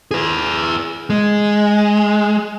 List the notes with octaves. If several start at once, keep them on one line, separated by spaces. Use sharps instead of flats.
G#4 B4
G#3